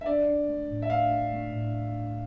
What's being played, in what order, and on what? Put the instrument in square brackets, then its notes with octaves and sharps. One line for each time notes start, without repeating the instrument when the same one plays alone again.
[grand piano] E5
[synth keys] D4 [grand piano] D5
[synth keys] D4
A3
A2
[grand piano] E5
[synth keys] A3 [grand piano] F5
[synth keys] A3
A3
A2